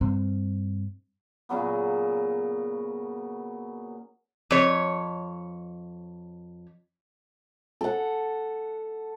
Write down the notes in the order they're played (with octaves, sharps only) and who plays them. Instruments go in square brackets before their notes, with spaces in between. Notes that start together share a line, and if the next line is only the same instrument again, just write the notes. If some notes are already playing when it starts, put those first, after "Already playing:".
[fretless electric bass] G2 C4
[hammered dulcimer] A#2 C#3 F#3 B3
[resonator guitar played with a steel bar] F2 C#5
[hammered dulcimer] A4 F#5